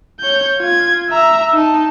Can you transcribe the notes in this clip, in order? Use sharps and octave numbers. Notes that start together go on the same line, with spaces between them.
C#5 G6
F4 G#6
E5 A#5
D#4 A5